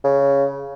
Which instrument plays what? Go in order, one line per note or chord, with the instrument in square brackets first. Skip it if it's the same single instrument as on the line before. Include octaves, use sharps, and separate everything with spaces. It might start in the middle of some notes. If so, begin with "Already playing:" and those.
[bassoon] C#3